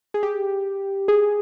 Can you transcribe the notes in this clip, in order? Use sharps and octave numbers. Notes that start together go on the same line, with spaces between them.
G#4
G4
G#4